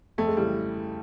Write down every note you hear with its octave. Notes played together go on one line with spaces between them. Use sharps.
F2 A3
G#3
C#3 E3 G3